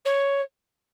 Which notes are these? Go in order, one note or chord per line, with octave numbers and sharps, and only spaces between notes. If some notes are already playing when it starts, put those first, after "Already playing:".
C#5